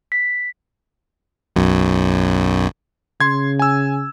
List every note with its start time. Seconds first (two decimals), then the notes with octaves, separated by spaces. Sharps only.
0.12 B6
1.56 B1 F#2
3.20 C#3 C6 G#6
3.59 G#5 E6